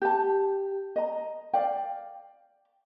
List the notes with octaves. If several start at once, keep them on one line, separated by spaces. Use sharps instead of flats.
G4 A5
D#5 A#5
D5 F5 G5